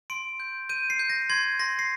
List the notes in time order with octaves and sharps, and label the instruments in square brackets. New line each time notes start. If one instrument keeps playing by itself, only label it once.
[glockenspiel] C6 D7
G6
G6 D#7
C7
G6
A#6
C6 G#6
C6 A#6
C7